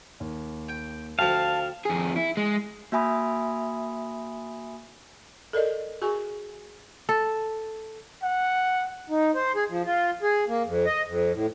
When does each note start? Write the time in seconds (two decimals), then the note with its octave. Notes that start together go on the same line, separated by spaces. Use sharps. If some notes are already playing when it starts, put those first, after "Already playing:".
0.20 D#2
0.69 G5
1.19 D2 F3 F5 G5 A5
1.85 F2 G#4
2.16 E4
2.37 G#3
2.92 A#3 F#4 E5 G#5 B5 D#6
5.53 A4 A#4 D5 D#5
6.02 F#4 G#4 G#5 C#6
7.09 A4
8.23 F#5
9.10 D#4
9.35 C5
9.55 G#4
9.69 F3
9.85 F4
10.22 G#4
10.48 A#3
10.65 F2
10.86 D#5
11.07 F2
11.33 A2